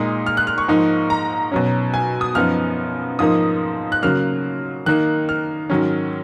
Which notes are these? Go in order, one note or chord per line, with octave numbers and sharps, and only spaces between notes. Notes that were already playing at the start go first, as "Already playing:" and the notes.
Already playing: A#2 G#3 D#4 D#6
F6
F#6
F6
C#6
G#2 F3 A#3 D#4
A#5
B2 F#3 C#4
G#5
D#6
F#2 F3 B3 D#4 F6
G#2 F3 A#3 D#4 D#6
F#6
C#3 F#3 A#3 F6
D#3 A#3 D#4 F#6
F6
G#2 D#3 F#3 C#4